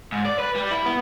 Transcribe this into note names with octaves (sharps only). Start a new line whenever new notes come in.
G#2
D5
B4
G3
E4
B3